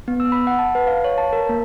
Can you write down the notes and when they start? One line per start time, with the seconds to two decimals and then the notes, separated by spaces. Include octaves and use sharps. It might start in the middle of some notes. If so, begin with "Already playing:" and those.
0.08 B3
0.20 E6
0.32 B5
0.47 F#5
0.59 A5
0.75 B4
0.87 F5
1.04 C#5
1.18 A5
1.33 A#4
1.49 A#3